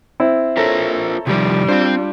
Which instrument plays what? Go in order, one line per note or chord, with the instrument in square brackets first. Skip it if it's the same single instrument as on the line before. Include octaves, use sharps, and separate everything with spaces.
[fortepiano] C4 E4
[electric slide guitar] F4 A#4 C5 [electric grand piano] A4 C#5 A#5
[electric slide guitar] C3 D#3 F3 [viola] G3
[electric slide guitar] C4 C5 [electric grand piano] D4 F4